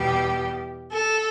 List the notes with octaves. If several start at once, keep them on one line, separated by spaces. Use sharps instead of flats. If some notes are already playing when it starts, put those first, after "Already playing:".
Already playing: E2 B2 G3 B3 G4
A4